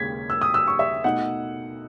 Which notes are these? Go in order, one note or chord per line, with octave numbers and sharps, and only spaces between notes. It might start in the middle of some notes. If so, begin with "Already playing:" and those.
Already playing: D#2 C#3 G#3 G#6 B6
E6
D#6
E6
C#6
E5
B2 A3 D#4 F#5